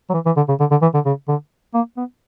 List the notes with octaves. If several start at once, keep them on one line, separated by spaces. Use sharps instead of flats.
F#3
E3
E3
D3
C#3
D3
D3
E3
D3
C#3
D3
A#3
B3